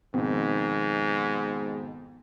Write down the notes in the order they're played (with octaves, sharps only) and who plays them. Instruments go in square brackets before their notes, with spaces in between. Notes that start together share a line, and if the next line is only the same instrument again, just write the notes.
[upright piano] F2 B2 D#3 [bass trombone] G#2